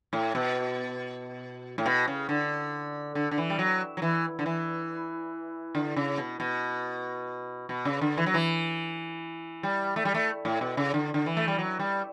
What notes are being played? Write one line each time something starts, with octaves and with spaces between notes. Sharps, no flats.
A2
B2
A2
B2
C#3
D3
D3
D3
E3
G3
F#3
F#3
E3
D3
E3
D3
C#3
B2
B2
B2
C#3
D3
E3
F#3
E3
G3
A3
G3
A3
A2
B2
C#3
D3
D3
E3
A3
G3
F#3
G3